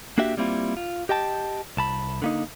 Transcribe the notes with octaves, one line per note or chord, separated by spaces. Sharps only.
A#3 D4 F#4 G4 E5
G3 A#3 C4 E4 F4
F4
G4 D#5 G5 A5
C2 A5 B5
D3 A#3 D#4